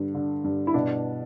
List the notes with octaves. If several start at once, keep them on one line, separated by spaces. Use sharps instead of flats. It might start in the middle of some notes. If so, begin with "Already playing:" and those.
Already playing: G2 D3
D3
G2
E4
B2 D4